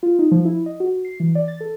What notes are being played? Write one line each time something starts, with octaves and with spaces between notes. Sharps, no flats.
F4
D#4
F3
E4
D#5
F#4
C7
E3
D5
A6
A4